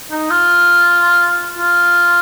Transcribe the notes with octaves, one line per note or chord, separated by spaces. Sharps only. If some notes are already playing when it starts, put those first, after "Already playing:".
D#4
F4
F4